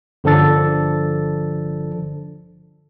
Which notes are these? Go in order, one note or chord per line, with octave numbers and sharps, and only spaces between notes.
G1 D3 F3 D4 A4 A6